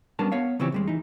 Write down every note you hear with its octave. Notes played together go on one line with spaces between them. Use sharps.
G3 B3 C#4 D4 A#4 A5
B3 C#5 F5
C#3 E3 F3 C4 G4 C#5
D#2 G3 G#3
E3 D#4